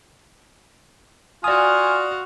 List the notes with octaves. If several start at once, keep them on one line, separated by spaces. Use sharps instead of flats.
F4 F#4 D5 F5 G#5 D#6